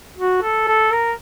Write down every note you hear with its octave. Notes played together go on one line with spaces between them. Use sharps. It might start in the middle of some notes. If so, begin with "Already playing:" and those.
F#4
A4
A4
A#4